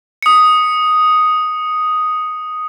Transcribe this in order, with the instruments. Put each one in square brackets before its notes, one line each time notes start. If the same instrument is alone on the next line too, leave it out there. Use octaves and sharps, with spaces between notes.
[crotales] D#6 C#7